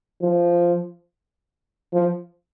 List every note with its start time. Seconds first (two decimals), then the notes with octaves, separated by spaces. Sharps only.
0.22 F3
1.93 F3